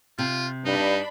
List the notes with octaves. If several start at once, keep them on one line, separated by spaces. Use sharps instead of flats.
C3 F4
G2 D4 D#4 B5